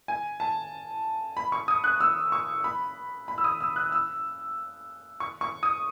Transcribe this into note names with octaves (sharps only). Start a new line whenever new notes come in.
G#5
A5
B5
C#6
D#6
F#6
E6
C#6
B5
B5
E6
D#6
E6
F#6
E6
C#6
C#6
D#6